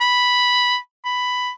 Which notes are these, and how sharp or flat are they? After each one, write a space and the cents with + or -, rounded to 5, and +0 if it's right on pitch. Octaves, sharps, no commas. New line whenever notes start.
B5 +0
B5 +10